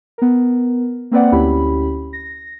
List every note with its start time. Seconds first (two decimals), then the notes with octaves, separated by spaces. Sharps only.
0.18 B3 A#4
1.11 A#3 C4 B4 D5 F#5
1.32 D2 C#4 E4 G4 B5
2.13 A#6